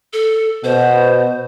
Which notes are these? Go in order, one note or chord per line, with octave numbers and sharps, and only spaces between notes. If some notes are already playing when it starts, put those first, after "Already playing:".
A4
B2 C5